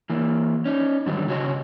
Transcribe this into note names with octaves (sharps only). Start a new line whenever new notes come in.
E3 A#3
C#4 D#4
G#2 D3 D#3 F#3 G3
C#3 F#4 C#5 D#5